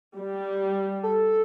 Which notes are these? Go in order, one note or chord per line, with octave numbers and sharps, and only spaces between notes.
G3
A4